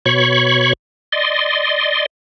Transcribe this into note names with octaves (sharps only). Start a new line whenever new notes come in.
B2 C#5 B5 C#6
D5 D#5 C6